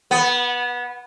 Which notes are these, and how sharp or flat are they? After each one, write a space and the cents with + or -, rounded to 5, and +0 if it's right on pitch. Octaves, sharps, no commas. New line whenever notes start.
B3 -20